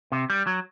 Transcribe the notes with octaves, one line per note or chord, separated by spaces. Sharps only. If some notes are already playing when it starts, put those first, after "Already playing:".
C3
G3
F#3